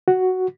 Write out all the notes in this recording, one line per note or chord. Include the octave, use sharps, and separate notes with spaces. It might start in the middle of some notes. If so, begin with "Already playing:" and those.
F#4